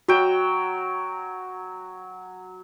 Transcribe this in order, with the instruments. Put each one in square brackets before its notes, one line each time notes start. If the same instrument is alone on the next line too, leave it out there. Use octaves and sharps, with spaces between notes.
[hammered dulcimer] F#3 G5 [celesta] F#4